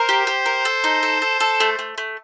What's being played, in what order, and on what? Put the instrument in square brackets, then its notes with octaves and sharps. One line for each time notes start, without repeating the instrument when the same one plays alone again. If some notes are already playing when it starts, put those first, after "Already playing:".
Already playing: [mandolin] A#4 [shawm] C5
[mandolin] G4
G4
A#4
A4
D#4
A4
A4
A4
A3
A3
A3